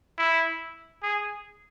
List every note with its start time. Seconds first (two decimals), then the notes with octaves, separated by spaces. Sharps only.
0.18 E4
1.03 G#4